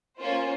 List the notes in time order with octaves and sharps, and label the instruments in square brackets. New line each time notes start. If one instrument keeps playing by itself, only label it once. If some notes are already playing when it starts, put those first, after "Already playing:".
[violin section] A#3 C#4 F4 C5